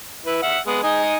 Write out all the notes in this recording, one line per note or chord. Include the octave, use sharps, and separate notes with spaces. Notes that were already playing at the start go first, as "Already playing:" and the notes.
E4 B4
E5 F#5
G#3 B3
D#4 D#5 G#5